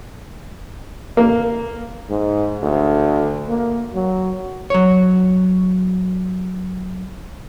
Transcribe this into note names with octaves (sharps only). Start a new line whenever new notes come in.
A#3
G#2
D2
A#3
F#3
F#3 C#5